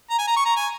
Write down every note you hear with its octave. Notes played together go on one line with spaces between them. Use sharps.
A#5
G#5
A#5
C#6
A#5
G#5